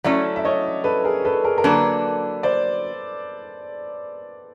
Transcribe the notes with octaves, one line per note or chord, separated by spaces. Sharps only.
F#3 A3 C#4 E4 D5 E5
E5
C#5 D#5
A4 B4
G#4 A#4
A4 B4
G#4 A#4
A#4
D3 F#3 A#3 D4 A4 B4
C5 D5